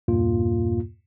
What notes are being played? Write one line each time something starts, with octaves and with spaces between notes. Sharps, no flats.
E2 G2 A#2 A#3 F4